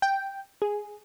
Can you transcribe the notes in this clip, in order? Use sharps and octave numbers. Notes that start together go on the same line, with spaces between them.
G5
G#4